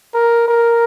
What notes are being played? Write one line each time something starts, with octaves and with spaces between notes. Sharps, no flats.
A#4
A#4